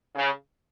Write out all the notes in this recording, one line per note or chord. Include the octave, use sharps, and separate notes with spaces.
C#3